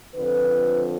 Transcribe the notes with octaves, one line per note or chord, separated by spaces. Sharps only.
F2 D3 F3 B4